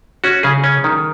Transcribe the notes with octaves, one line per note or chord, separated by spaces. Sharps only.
C#4 F#4
C#3 G#4
C#4
D#3